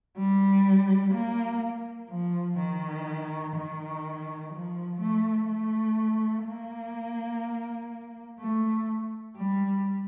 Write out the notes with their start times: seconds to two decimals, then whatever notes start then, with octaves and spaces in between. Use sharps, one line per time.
0.17 G3
1.14 A#3
2.10 F3
2.59 D#3
3.55 D#3
4.53 F3
5.00 A3
5.49 A3
6.46 A#3
8.39 A3
9.37 G3